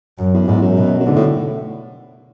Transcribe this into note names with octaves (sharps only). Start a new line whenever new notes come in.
F#2
E2
E2 G#2
F#2
B2
F#2
G#2 D3
A2